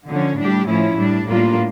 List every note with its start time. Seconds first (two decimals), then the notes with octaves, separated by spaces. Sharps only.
0.09 D3 F3 C#4
0.38 A2 G3 D4 G4
0.68 A2 F3 C#4 E4
0.98 A2 G3 D4
1.27 A2 G3 A#3 D4 F4